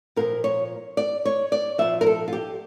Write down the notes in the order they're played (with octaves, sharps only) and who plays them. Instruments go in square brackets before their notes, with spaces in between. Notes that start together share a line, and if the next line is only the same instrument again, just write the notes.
[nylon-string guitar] A#2 F3 A#4
C#5
D5
C#5
D5
A#2 F3 E5
A#4
A4
F4
G4